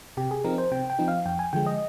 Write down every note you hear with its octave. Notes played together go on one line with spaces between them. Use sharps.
C3 G4
G#4
F3 C4 D#4 A#4
C5
C3 G5
G5
F3 C4 D#4
F5
F2 G5
G#5
D3 F3 G#3 G5
D#5